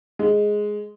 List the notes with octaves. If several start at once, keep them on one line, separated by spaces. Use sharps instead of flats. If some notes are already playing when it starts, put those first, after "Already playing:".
G#3